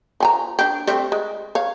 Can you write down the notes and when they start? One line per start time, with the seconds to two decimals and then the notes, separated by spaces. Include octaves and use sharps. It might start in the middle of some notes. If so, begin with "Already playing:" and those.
0.20 F3 G#5 A#5
0.59 D4 G4
0.87 G3 A3 C4
1.12 G#3
1.55 C#5 F5